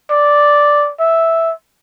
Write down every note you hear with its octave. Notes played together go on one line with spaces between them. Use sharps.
D5
E5